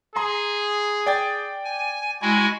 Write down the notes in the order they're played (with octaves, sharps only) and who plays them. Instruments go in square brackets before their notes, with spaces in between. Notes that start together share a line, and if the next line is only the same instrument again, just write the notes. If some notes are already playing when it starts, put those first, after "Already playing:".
[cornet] G#4 [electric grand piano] A#5 C6
[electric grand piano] D5 G5 A6
[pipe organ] G#5
[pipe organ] G#3 E4 F#4 [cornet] G#5